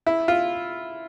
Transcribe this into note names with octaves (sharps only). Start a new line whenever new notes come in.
E4
F4